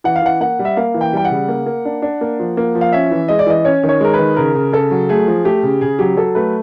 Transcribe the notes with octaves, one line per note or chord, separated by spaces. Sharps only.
E3 F#5
F5
E3 F#5
A#3 F#5
G3
E5
A#3 F5
E3
G5
G3 G5
F#5
C#3
A#3
A#3
D4
D4
A#3
F3
A#3
F3
F5
C#4 E5
E3
G#3 D#5
D5
E3 D#5
C#4 C#5
D#3
C#5
G#3 A#4
B4
D#3
C#3 A#4
C#3
C#3 A4
F#3
A3 G#4
F3
A3 G4
C#3
C#3 G#4
F#3 G4
F#3 A4
A3 B4